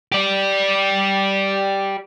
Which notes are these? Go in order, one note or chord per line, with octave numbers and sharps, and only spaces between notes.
G4 D5